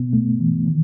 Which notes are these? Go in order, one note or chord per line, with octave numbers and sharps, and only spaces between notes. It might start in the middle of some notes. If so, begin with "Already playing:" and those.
Already playing: B2 B3
A3
E3
D#3